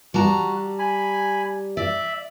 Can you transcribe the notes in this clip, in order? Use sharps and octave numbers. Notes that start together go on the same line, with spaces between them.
G3 F#4 A5 A#5
G#5 B5
D5 E5